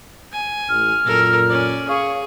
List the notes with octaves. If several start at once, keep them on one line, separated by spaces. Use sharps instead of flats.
G#5
A1 F6
F#2 A#2 A4 A#4
C#4 D5
G#4 C#5 F5 C#6